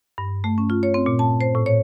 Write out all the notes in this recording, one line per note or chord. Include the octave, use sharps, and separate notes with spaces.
G2
A3
C#4
F4
C#5
C4
A#2
A5
C5
A2
C#5